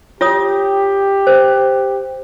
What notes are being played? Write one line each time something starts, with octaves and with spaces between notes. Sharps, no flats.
F4 G4 C#5 D#6
C5